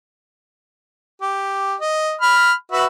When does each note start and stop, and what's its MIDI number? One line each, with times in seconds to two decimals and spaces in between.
1.22 1.74 67
1.81 2.16 75
2.21 2.53 83
2.21 2.53 89
2.72 2.86 66
2.72 2.86 71
2.72 2.86 76